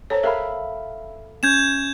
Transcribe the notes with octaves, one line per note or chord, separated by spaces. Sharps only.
A4 C5 C#5 A#5
G#4 A#4 E5 F5 B5
C#4 G6 G#6 E7